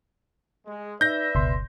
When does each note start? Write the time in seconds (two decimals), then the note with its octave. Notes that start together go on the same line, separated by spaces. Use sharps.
0.66 G#3
1.01 D#4 B4 D5 E5 G6 A#6
1.35 F#1 C#2 B2 C6